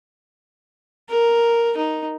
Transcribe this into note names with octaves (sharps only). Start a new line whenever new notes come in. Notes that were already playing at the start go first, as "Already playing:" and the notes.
A#4
D#4